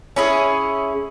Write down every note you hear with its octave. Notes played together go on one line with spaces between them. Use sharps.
C#4 E4 G#4